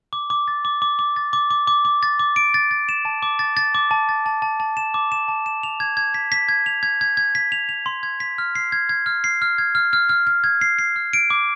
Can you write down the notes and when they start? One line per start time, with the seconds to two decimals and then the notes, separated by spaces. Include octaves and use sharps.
0.13 D6
0.30 D6
0.48 A6
0.65 D6
0.82 D6
0.99 D6
1.16 A6
1.33 D6
1.51 D6
1.67 D6
1.85 D6
2.03 A6
2.19 D6
2.36 D7
2.54 A6
2.71 A6
2.89 E7
3.05 A5
3.23 D6
3.39 A6
3.57 A6
3.75 D6
3.91 A5
4.09 A6
4.26 A5
4.42 A5
4.60 A5
4.77 E7
4.94 D6
5.12 E7
5.28 A5
5.46 E7
5.63 F7
5.80 G#6
5.97 G#6
6.14 B6
6.32 B6
6.49 G#6
6.66 F7
6.83 G#6
7.01 G#6
7.17 G#6
7.35 B6
7.52 F7
7.69 F7
7.86 C6
8.03 G#6
8.20 B6
8.38 F6
8.55 C7
8.72 G#6
8.89 G#6
9.06 F6
9.24 C7
9.42 F6
9.58 G#6
9.75 F6
9.93 F6
10.09 F6
10.27 F6
10.44 G#6
10.61 C7
10.79 C7
10.96 F6
11.13 D7
11.30 D6